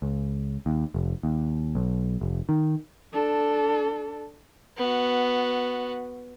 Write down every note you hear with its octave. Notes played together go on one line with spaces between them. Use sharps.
C#2
D#2
F1
D#2
B1
F1
D#3
D4 A4
B3 F#4